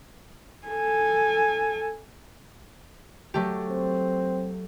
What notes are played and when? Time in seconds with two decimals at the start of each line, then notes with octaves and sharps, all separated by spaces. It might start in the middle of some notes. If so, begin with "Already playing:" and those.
0.67 A4 G#5
3.34 F#3 A3 G4
3.69 C4